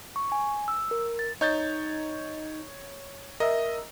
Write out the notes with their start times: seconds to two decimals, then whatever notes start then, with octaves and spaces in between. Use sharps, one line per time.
0.16 C#6
0.32 G#5
0.68 E6
0.91 A#4
1.19 A6
1.41 D#4 C#5 G6 A6
3.40 A#4 D#5 E5